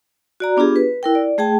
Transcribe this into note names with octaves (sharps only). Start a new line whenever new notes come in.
F#4 D5 A#5
B3 D4 F4 G4 G#4
B4
E4 A#4 G5
D5
A3 G#4 G5 A5